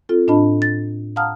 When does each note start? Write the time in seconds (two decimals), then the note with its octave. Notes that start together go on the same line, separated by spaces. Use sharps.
0.09 C4 F4 A4
0.28 A2 D4 F4 D#5 A5 B5
0.62 A6
1.16 F5 F#5 A5 A#5 D#6 F6